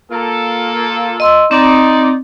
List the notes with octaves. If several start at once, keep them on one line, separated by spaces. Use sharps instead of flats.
A#3 F4 A4
D#5 C6 E6
C4 D#4 D5